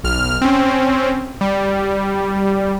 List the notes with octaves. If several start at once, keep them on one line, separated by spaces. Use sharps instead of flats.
B1 F6
C4 C#4
G3